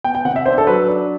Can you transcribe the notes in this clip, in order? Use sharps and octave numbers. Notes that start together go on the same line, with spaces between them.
B3 G5
G5
C3 F#5
E5
D4 C5
A4
F#3 B4
D4